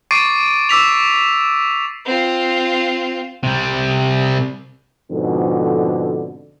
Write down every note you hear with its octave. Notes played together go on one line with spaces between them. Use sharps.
C#6 D6 A6 C7 D7 D#7
D6 E6 B6 F7
C4 F4
C3 G3
F2 G#2 B2 D3